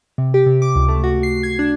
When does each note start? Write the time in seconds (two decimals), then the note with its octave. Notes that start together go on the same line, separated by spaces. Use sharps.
0.18 C3
0.34 G4
0.46 C3
0.62 D6
0.76 C#2
0.88 A3
1.04 F#4
1.23 C7
1.43 G#6
1.59 D4